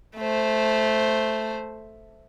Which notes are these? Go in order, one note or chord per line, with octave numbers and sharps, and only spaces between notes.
A3 C5